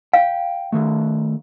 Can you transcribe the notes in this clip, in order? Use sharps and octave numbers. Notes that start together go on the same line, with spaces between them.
F5 G5
D#3 A3